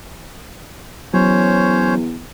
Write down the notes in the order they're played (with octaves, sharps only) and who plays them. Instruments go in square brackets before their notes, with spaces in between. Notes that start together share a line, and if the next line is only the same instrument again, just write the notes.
[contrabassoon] E2 [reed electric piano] F#3 [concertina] C#4 C5 C#5